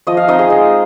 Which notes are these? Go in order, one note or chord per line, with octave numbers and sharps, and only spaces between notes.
F3 D#5
F5
C4 D#4 D#5
G#4
G#3